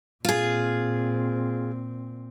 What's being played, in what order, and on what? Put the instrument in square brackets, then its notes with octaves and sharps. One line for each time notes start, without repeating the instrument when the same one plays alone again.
[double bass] A#2 C4 [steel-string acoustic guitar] F4 G#4